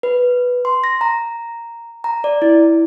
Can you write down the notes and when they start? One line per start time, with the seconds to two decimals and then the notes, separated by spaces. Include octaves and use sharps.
0.03 B4
0.65 C6
0.84 A#6
1.01 A#5
2.04 A#5
2.24 D5
2.42 E4